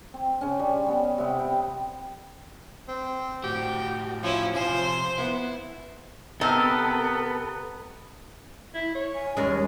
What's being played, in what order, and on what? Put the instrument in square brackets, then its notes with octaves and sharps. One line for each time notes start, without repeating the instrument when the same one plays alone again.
[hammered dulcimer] C4
C#3 C#4
G3
G3 B3
C3 B3
G5
[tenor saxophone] C4
[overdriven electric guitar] A2 F#4 [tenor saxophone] G4
[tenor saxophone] F3 [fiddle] C#4 E4
[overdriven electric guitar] C3 G#5 [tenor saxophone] F3 [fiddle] C5
[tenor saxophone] B3 [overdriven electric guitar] E4
[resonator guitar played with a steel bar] C3 C4 D#5 [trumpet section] B3 [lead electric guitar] A4 [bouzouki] A#4
[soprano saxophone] E4
C#5
[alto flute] G#5
[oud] D#2 G3 G#3 [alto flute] C#4 [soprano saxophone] A#4